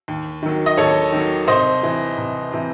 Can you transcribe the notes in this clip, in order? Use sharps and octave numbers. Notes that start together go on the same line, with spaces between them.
D#2
D#3 F#3
D#5
D#2 A4 C#5
D#3 F#3
C2 C5 D#5
C3 E3
C2
C3 E3